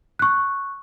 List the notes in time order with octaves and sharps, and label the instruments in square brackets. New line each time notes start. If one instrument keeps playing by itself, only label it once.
[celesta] C#6 F#6